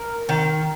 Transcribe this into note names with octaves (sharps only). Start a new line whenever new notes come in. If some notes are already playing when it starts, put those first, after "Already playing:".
Already playing: A#4
D#3